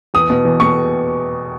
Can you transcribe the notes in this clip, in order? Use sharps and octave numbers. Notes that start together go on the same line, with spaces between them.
E2 D#6
B2
E2
B2 C#6